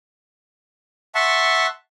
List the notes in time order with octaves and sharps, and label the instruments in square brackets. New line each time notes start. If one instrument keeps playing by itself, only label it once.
[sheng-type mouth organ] E5 F#5 A5 C6 C#6